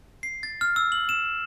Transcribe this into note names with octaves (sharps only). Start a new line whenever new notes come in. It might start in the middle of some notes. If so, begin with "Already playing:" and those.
C7
A6
F6
E6
F#7
E7